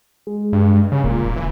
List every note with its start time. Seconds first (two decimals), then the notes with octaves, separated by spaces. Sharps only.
0.27 G#3
0.53 G2
0.92 C#3
1.04 D#1 A#2
1.36 E3